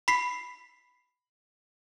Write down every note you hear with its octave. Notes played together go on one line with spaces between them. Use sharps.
B5 B6 C7